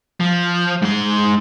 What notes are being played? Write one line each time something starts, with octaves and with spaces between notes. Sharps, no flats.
F3
G#2 C6